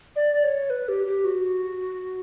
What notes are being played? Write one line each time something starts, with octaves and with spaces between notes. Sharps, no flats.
D5
C#5
B4
G4
G4
F#4